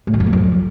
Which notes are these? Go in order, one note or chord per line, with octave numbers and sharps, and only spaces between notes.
A2
D#3
F2
F#3
F2